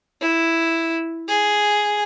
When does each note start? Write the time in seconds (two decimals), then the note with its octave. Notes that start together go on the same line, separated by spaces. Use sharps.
0.21 E4
1.28 G#4